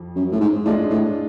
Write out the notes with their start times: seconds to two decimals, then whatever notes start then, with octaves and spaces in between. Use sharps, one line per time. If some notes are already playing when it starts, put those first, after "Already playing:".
Already playing: F2 F3
0.16 F#2
0.32 A2
0.40 G#2
0.65 A2 G#3 D4 F4
0.90 A2